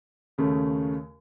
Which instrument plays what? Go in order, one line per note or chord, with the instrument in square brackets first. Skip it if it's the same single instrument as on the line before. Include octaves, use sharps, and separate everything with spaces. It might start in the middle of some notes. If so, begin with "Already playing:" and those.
[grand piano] D#2 C#3 A3